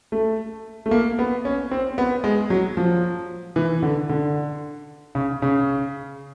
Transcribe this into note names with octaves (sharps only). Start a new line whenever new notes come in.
A3
A3
A#3
B3
C#4
C4
B3
G#3
F#3
F3
E3
D3
D3
C#3
C#3